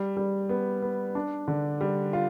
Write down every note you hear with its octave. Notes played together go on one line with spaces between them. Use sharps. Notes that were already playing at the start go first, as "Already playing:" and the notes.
Already playing: G3
G3
B3
B3
D4
D3
G3
F4